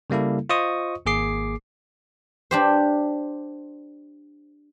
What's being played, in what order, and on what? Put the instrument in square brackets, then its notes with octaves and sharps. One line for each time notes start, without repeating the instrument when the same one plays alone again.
[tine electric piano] C#3 G3 A#3 E4 A4
F4 C5 D#5 C#6 D#6
G#1 A#3 G#4 D6 C7
[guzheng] D4 G4 C5